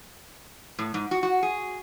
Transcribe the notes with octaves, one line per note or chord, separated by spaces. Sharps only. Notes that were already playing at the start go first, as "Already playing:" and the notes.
A2
G#2
F#4
F#4
G#4